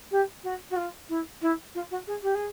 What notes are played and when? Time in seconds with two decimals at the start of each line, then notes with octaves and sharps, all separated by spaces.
0.11 G4
0.43 F#4
0.70 F#4
0.76 F4
1.09 E4
1.41 E4
1.74 F4
1.91 F#4
2.07 G#4
2.22 G4
2.34 G#4